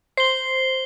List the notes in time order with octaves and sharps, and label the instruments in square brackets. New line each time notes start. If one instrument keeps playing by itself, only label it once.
[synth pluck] C5 [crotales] C7 G7